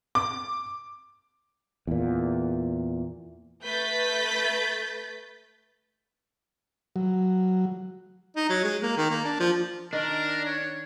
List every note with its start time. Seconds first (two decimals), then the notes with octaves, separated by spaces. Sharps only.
0.15 D6
1.87 E2 A#2
3.62 A3 B4 G6 A6 B6
6.96 F#3
8.36 D#4
8.50 F#3
8.64 G#3
8.83 A#3
8.97 D#3
9.11 A#3
9.25 D4
9.40 F3
9.93 D#3 D4 A#4
10.46 C#5